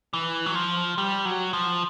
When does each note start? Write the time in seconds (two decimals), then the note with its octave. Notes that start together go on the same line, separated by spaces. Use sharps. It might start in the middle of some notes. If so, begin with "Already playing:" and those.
0.13 E3
0.46 F#3
0.55 F3
0.98 G3
1.25 F#3
1.53 F3